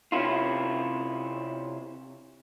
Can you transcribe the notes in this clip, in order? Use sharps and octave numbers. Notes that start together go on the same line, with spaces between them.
C3 C4 C#4 E4 F4